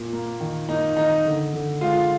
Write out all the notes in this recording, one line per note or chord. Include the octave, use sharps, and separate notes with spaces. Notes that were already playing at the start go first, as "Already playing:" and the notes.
Already playing: A#2
A#3
D#3
A#3 D#4
D#3 D#4
D3
D3
G#3 F4